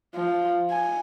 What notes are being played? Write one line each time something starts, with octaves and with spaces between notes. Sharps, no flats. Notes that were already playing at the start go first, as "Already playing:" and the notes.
F3
G#5